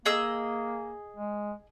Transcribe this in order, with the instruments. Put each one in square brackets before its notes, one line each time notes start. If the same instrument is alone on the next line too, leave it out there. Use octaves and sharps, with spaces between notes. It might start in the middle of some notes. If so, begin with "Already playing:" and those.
[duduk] A#3 [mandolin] G#4 D#5 E6
[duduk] G#3